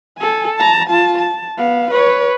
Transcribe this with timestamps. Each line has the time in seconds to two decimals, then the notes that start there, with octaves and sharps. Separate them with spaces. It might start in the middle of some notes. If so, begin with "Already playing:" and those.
0.18 A4 G#5
0.57 A5 A#5
0.88 F4 A5
1.19 A5
1.57 B3 F5
1.91 B4 C#5